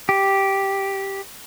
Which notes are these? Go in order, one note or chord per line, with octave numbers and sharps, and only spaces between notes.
G4